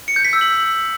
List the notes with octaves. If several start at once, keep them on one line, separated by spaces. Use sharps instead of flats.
C#7
G6
B6
E6
F#7